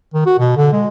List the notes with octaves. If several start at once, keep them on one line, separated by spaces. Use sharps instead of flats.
D#3
F#4
B2
D3
G#3